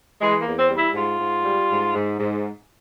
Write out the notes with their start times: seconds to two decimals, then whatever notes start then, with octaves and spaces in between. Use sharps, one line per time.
0.20 E3 G#3
0.39 A#3
0.46 E2
0.58 C4
0.70 G3
0.76 E4
0.94 G#2 F4
1.20 G#2
1.44 G3
1.70 G#2
1.94 G#2
2.19 G#2